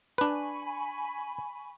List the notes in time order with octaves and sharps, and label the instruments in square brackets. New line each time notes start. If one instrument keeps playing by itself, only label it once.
[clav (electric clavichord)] D4 B4 [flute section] G#5 B5 C#6